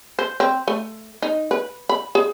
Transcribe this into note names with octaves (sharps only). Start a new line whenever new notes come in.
C5
C4
A3
D#4
B4
B5
G#4